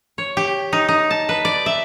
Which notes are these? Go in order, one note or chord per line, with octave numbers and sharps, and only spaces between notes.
C#5
G4
D#4
D#4
A5
B4
D5
E5